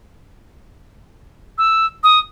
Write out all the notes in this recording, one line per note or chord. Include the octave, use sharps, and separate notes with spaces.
E6
D#6